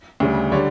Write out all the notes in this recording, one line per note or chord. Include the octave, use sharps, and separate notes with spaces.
D2 C#3 G3
D3 G3 C#5